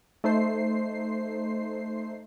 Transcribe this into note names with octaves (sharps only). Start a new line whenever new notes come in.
A3 D#4 C5 C7